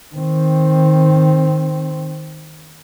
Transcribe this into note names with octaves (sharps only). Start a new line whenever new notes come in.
D#3 C4